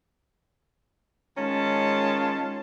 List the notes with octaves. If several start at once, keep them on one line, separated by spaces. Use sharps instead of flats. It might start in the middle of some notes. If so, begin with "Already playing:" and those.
D#3 G#3 C#4 F4 A5